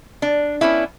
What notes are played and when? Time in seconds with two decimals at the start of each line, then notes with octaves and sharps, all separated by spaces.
0.22 D4
0.61 B3 C#4 D4 E4